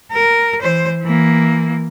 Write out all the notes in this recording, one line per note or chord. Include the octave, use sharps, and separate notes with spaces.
A#4
E3 C5
E3 A#3